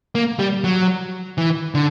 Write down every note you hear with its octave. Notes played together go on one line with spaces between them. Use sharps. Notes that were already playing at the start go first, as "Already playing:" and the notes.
A#3
G3
F#3
E3
D3